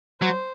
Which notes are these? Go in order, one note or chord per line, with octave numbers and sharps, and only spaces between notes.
F#3 C5